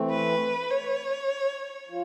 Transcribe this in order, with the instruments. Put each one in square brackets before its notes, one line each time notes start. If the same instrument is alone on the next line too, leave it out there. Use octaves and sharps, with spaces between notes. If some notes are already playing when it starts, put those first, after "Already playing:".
Already playing: [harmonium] E3 A3 C4
[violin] B4
C#5
[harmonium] F3